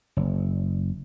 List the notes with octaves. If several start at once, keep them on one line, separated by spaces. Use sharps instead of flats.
F#1